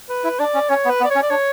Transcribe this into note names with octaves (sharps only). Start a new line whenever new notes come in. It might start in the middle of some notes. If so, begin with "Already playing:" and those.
B4
E4
D4 D5
C#4
C#4 C#5
B3
B4
B3
D5
C#4 C#5
D5
D4 C#5